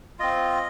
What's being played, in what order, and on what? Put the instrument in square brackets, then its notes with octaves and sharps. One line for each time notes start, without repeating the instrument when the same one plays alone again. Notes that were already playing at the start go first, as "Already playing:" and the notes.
[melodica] C4 F4 D#5